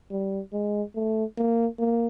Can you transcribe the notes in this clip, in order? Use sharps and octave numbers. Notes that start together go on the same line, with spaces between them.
G3
G#3
A3
A#3
A#3